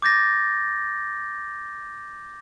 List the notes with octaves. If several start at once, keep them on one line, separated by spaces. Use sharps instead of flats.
D6 G6 A6 A#6